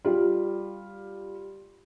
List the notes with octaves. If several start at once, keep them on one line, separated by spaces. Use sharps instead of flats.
G3 F4